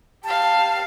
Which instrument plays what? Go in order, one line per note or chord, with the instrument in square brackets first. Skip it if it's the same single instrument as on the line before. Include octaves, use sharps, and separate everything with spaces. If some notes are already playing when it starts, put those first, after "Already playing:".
[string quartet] G4 F5 [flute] A5